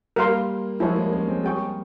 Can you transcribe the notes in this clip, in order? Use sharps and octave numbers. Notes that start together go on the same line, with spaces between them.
G3 A#3 A#4 F5 C6
F3 G#3 E4 A#4 C#5 E5
G3 A#3
A#3 C#4
G#3 C4
G3 A#3 G#4 C5 G5 C#6